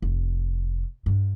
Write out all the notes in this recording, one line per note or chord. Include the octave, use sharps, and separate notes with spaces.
F1
G2